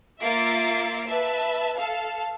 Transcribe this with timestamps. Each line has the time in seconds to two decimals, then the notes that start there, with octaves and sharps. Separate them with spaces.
0.22 A#3 F4 E5 A6 C7 D7
1.06 B4 E5 A5
1.79 A4 F5 A5